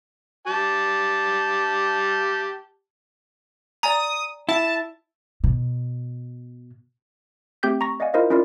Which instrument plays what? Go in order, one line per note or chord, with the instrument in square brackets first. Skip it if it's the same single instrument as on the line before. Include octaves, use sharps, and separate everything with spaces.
[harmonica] G4 A5
[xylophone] D5 G#5 A#5 [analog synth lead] D#6
[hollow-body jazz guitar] E4 [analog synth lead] A5
[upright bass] B2
[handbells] A3 C4 G4 G5 G6 B6
A#5 C#6 A#6
D5 D#5 F5 F#5 G#5
E4 F4 A#4 C5 D#5 F5
C#4 E4 F4 A#4 D5